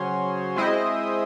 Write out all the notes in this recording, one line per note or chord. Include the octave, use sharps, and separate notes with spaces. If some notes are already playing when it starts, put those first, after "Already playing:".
Already playing: C#3 F#3 C#4 G#4 C5
G#3 C4 E4 C5 D#5